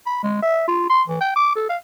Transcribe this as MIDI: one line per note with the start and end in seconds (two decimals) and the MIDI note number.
0.06 0.19 83
0.23 0.39 56
0.42 0.66 76
0.68 0.87 65
0.90 1.03 84
1.08 1.21 52
1.21 1.33 79
1.36 1.56 86
1.56 1.69 69
1.69 1.77 77